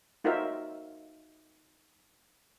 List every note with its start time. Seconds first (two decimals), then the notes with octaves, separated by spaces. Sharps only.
0.24 D#4 F4 F#4 A#4 C5 E5